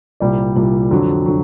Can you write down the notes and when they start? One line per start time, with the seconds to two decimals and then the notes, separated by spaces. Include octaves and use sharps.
0.20 C2 A#2 G3 D5
0.56 C2 A#2 G3
0.91 F2 D3 F#3
1.26 D3 F#3